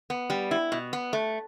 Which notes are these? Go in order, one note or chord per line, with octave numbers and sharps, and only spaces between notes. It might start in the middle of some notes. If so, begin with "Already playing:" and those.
B3
G3
E4
B2
B3
A3